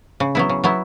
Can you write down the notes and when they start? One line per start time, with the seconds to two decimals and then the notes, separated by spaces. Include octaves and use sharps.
0.20 C#3
0.35 F#3 B3 E4
0.49 C#3
0.64 F#3 B3 E4